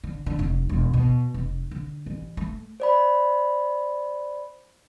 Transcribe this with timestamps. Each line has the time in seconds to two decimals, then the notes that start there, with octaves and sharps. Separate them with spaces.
0.04 D3
0.26 D3
0.39 F1
0.69 E1
0.94 B2
1.34 F1
1.71 D3
2.06 A1
2.37 A3
2.80 C5 D5 B5